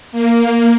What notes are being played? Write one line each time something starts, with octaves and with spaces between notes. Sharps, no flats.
A#3